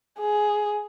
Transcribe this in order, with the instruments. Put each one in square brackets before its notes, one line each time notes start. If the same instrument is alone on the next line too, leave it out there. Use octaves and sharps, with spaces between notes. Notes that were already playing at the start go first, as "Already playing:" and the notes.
[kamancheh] G#4